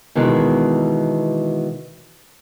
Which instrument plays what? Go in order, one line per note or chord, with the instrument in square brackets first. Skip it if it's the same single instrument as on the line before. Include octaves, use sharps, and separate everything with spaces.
[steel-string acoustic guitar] B2 D#3 E3 G#3